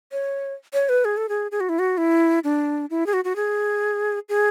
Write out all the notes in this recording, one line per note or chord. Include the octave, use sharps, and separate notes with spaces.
C#5
C#5
B4
G#4
A4
G#4
G#4
F#4
E4
F#4
E4
D4
E4
G#4
F#4
F#4
G#4
G#4